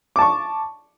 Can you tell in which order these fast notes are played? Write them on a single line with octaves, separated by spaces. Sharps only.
D6 A5 C#6